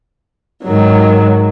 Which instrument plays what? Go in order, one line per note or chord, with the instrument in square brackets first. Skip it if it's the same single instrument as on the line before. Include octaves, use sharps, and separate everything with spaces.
[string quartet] G#2 D#3 F#3